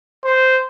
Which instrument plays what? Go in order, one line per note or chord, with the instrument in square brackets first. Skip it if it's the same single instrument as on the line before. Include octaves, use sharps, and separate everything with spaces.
[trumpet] C5